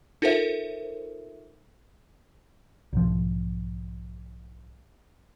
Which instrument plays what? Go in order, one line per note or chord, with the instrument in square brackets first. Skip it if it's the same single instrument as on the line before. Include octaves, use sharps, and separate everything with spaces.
[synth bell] D#4 F4 A4 A#4 C5 E5
[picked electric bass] B1 G#2 F3